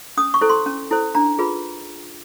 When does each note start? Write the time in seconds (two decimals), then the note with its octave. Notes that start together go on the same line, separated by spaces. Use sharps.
0.17 C#4 D#6
0.34 C#6
0.41 E4 A4 C5
0.49 C6
0.66 C#4
0.91 E4 A4 C5
1.15 D4 A#5
1.39 F4 G#4 B4